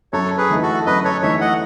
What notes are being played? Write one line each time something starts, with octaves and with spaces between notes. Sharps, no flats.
F#2 A4 C#5
G#4 B4
E3 A3 D#4
F#4 A4
F#2 B4 D#5
A4 C#5
E3 A3 D#4 C#5 E5
D#5 F#5